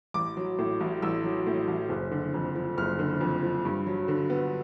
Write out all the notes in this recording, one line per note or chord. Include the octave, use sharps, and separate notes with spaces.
A1 D6
F#3
A2
A1
A1 E6
F#3
A2
A1
F#1
D3
F2
F3
F#1 F6
D3
F2
F3
G2
F#3
D3
B3